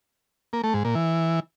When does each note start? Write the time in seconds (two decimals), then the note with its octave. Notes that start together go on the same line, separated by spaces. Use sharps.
0.53 A#3
0.64 A3
0.74 G#2
0.85 A#2
0.95 E3